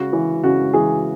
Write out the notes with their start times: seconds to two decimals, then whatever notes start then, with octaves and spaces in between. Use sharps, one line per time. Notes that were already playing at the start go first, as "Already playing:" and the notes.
Already playing: C#3 F#4
0.13 E3
0.43 C#3 F#4
0.73 E3 G#4